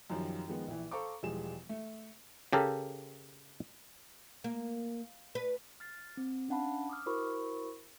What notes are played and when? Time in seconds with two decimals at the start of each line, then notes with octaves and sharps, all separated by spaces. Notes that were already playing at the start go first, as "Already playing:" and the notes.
0.10 F#2 D#3 F3 G3
0.48 D#3 F3 G#3 B3
0.68 A#1 E3
0.91 A4 C5 F5 A#5 C#6 D6
1.23 E1 F3 G3 G#3 G#4 E7
1.69 A3
2.53 C#3 G4 A4 A#4
4.44 A#3
5.35 B4
5.80 F6 A6 C7
6.17 C4
6.49 C#4 D4 F5 F#5 A5 B5
6.89 D6 D#6 F6
7.06 E4 F#4 A#4 C5 B5 C#6